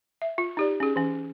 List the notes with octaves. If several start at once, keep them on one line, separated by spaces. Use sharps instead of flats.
E5
F4
D#4 G4 D5
C#4 G#4
E3 C#4